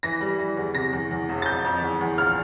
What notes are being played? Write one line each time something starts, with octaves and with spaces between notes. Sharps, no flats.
E3 A#6
G3
E3
E2
C3 A#6
E2
E2
E1
A6
F2 G6
F2
E2
E2
A#1 F6